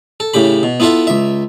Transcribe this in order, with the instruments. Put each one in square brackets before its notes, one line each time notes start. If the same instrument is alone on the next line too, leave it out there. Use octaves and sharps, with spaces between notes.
[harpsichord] A4
A2 C#3 G4 B5
B2
B3 E4 F4 A4 E5
C#2 E5